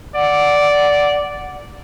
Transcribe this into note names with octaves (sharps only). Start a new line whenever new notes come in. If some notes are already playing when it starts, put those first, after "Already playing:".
D5 F#5